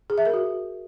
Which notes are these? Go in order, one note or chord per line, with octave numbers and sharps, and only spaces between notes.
G#4
E5
A#4
F#4